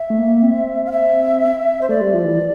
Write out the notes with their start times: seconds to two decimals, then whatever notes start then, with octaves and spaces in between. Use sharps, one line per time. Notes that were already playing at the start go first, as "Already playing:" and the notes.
Already playing: E5
0.10 A3
0.19 A#3
0.43 C4
0.86 F5
0.92 E5
1.81 C5
1.89 A3 D5
2.01 G3
2.14 F3
2.25 E3